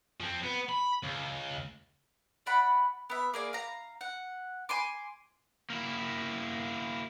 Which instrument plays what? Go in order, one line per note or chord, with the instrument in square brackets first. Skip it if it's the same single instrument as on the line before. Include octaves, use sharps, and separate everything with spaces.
[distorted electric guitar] F3 C4
B3
B5
C#2
[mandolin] D5 F#5 B5
B3 E5
A#3 G#4 D5
F5 A#5
F#5
G#5 C6 D6
[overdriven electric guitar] A#3 E4